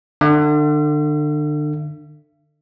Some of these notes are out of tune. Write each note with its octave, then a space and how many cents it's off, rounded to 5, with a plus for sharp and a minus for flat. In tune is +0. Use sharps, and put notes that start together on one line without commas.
D3 +30 E5 +45